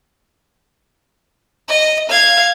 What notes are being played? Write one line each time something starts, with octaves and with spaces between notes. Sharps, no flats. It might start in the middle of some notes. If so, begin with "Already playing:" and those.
D#5
F5 G#6